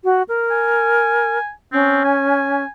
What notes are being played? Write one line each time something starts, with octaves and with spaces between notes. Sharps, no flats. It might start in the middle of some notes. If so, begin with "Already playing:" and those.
F#4
A#4
G#5
C4 C#4
G#5